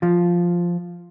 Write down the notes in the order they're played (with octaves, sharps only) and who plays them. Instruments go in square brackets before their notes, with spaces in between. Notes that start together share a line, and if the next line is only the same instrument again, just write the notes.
[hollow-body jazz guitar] F3 F4